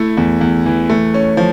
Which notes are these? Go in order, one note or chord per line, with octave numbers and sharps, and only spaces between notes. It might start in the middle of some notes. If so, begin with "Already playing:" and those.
Already playing: A3 E4
E2
E2
E3
A3
C#4
F3